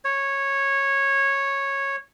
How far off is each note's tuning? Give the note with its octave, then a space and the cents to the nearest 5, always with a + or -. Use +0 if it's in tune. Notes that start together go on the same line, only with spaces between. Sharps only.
C#5 -10